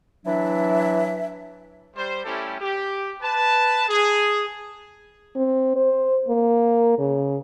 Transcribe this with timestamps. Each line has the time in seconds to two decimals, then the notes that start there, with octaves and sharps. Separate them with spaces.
0.26 E3 F#3 D4 E5
1.95 G3 C5
2.24 G3 A3 C#4 E4 G4 A4
2.60 G4
3.22 B4 A5
3.88 G#4
5.36 C4
5.76 C5
6.29 A#3
6.99 C#3